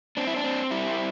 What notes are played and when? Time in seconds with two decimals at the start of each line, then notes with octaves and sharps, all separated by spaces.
0.17 C4 D4
0.27 E4
0.36 D4
0.44 C4
0.71 G3 E4